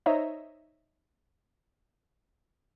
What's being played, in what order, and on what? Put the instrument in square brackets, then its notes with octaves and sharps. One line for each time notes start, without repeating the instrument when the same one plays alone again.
[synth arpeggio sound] D#4 C5 C#5 D#5 E5 A#5